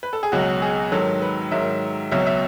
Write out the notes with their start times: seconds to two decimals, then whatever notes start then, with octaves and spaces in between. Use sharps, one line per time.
0.03 B4
0.13 A4
0.23 G#4
0.32 C#2 B2 F#3 F#4
0.62 G#4
0.92 G#2 D#3 F#3 A4
1.22 B4
1.51 G#2 D#3 F#3 E5
2.11 C#2 B2 F#3 E5
2.26 E5